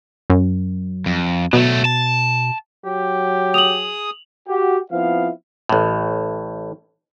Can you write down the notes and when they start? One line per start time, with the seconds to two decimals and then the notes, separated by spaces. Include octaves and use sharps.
0.30 F#2
1.06 F2
1.53 B2 F#3 A3
1.85 A5
2.85 F#3 G4
3.54 G#4 D#6 F7 F#7
4.48 F#4 G4
4.91 F3 B3 C4 E4 F5
5.69 A1 A2